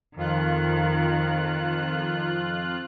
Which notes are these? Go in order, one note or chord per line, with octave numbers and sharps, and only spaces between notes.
F2 D#3 F4 F#6